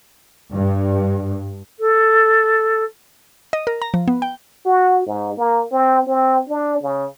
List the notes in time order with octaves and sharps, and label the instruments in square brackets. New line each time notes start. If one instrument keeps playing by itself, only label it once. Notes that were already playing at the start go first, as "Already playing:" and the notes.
[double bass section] G2
[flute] A4
[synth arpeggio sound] D#5
A#4
A#5
F3
B3
G5
[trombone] F#4
G#2
A#3
C4
C4
D4
C#3